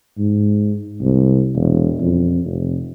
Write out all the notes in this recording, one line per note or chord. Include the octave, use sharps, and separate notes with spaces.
G#2
C2
E1
F2
F1